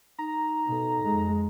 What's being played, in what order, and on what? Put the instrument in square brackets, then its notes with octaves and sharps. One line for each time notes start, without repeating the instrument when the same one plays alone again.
[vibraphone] D#4 [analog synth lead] A#5
[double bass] B2 [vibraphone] D#4 A4
[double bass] F2 G#3